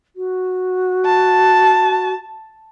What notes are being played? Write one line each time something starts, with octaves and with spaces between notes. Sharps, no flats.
F#4
A5